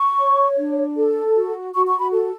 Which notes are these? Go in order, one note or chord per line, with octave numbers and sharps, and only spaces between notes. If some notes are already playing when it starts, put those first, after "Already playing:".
Already playing: C#6
C#5
D4
A4
F#4
F#4 C#6
C#6
B5
A4